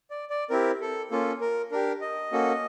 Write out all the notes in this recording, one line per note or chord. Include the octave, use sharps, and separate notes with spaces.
D5
D5
C4 E4 G4 A#4
A4
A#3 C#4 F4 A4
A#4
D4 G4 A#4
D#5
A#3 C#4 F#4 A4